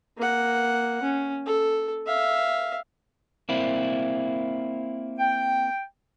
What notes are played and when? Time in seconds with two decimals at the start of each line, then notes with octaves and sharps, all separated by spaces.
0.18 A#3 F#5
1.03 C#4
1.46 A4
2.07 E5 F5
3.49 A#3 C4 E4
5.19 G5